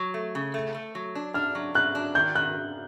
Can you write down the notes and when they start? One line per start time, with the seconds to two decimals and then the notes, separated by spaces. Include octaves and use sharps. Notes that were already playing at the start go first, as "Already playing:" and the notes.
Already playing: F#3
0.14 A3
0.35 C#3
0.54 A3
0.74 A3
0.95 F#3
1.15 D4
1.34 D4 F6
1.55 F#3
1.74 F#3 F#6
1.95 D4
2.15 D#3 G6
2.35 D#3 F#6